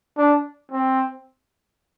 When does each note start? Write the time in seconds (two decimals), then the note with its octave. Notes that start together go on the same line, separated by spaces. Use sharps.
0.17 D4
0.71 C4